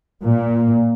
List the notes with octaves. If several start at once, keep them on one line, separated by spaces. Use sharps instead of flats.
A#2